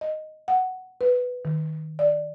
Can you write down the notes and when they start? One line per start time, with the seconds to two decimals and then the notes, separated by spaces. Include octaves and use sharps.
0.01 D#5
0.48 F#5
1.01 B4
1.45 D#3
1.99 D5